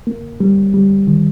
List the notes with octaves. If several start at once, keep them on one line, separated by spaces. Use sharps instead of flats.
A#3
G3
G3
D#3